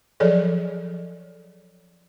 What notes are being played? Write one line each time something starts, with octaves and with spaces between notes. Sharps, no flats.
F3 F#3 G#4 A4 C#5 D5